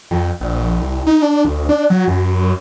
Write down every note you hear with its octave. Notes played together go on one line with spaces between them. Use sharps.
F2
A#1
C2
D#4
D4
D2
D4
F#3
F#2